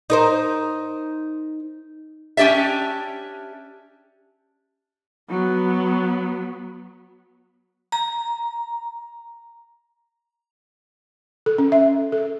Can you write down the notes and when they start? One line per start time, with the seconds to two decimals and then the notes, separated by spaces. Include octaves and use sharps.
0.10 D#4 A#4 C5
2.37 C#4 D4 G4 D5 E5
5.30 F#3 B3
7.92 A#5
11.46 A4
11.58 C#4
11.72 E5
12.12 A4